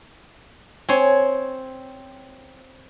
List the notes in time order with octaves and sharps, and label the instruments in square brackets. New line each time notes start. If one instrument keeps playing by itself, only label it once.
[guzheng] C4 C#5 G#5 C6